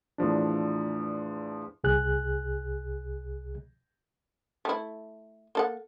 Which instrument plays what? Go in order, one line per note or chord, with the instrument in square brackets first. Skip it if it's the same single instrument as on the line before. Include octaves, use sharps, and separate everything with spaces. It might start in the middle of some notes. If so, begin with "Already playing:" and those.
[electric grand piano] E2 A2 F3 D4
[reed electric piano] C2 G#4 F#6
[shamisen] A3 E4
A#3 A4 F#5